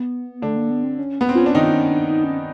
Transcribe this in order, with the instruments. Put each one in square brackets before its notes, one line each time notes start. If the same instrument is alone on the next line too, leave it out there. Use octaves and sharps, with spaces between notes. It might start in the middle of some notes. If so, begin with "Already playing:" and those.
Already playing: [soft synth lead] B3
[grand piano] D3 D4 [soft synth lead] A3
[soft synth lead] A#3
B3
C4
C#4
[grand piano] B3
C4
[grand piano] C#4 [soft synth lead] F4
[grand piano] D4
[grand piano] D#3 D#4 [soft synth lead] F4
[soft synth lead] C#4
D4
D#4
C#4